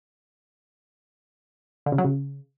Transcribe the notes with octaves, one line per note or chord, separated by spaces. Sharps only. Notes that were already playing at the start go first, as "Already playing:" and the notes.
D3
C#3
F#3
C#3